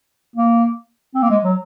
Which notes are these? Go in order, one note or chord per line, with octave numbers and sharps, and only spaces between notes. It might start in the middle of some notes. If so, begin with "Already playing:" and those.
A#3
C4
A#3
G#3
F#3